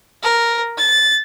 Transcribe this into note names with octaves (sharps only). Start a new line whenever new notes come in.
A#4
A6